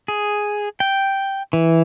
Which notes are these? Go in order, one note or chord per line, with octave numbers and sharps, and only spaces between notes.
G#4
G5
E3